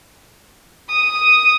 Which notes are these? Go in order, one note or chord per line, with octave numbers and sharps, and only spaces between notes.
D#6